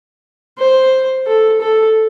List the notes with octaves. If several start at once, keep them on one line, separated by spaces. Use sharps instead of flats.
C5
A4
A4